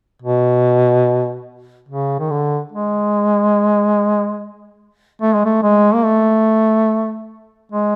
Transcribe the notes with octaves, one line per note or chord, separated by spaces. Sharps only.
B2
C#3
D#3
D3
G#3
A3
G#3
A3
G#3
A#3
A3
G#3